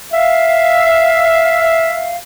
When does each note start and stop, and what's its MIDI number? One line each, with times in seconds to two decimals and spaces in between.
0.13 2.17 76
0.13 2.17 77